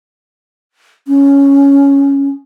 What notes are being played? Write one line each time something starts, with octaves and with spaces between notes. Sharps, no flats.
C#4